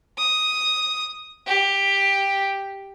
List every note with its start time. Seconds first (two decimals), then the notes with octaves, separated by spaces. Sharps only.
0.18 D#6
1.47 G4